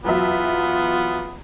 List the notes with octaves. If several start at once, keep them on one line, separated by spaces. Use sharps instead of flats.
E2 F#3 B3 F4 E5